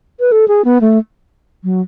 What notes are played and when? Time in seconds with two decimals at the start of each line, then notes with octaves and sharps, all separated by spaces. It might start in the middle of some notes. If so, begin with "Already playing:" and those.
0.20 B4
0.32 A4
0.48 G#4
0.65 B3
0.81 A3
1.64 F#3